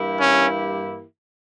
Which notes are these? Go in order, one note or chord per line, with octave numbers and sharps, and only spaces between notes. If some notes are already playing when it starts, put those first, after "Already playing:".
Already playing: G2 E3 A#3 E4 G4
C#4